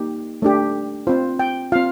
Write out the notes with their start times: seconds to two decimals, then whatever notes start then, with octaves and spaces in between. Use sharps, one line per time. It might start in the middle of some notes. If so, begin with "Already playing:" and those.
Already playing: A#3 D#4 G4
0.42 A3 D4 G4
1.07 C4 F4 C5
1.39 G5
1.72 C4 F4 F5